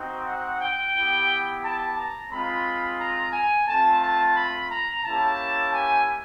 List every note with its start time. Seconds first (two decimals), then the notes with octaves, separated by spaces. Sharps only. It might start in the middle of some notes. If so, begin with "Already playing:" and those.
Already playing: C4 D#4 F#4
0.26 F#5
0.60 G5
0.95 B3 E4 G4
1.63 A5
1.97 A#5
2.30 G#3 C4 F4 B5
2.99 A#5
3.32 G#5
3.67 A3 C4 F4 A5
4.01 A5
4.35 B5
4.70 A#5
5.03 A#3 C#4 E4 G4 A5
5.72 G#5